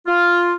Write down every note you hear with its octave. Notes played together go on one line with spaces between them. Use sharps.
F4